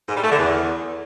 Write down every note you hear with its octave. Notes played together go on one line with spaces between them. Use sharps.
G#2
G3
A3
D3
E2